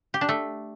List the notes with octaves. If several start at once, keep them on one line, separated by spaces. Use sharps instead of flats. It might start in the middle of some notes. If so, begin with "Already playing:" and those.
G4
D4
A3